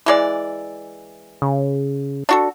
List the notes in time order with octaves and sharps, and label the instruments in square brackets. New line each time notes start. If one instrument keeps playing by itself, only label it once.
[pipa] E3 G#3 D5
[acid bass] C#3
[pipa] D4 F#4 A4